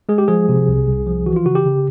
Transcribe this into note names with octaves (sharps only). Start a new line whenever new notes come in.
G#3 G#4
G4
F3 G#4
C3
C2
C2
F3
E3 F#4
F4
C#3 F#4
G4
C#3